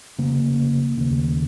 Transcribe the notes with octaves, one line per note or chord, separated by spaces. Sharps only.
F1 D#2 C#3 A#3
F1 D#2 C#3